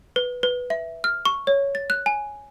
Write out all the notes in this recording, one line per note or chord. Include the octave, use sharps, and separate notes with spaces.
B4
B4
E5
F6
C#6
C#5
A6
F#6
G#5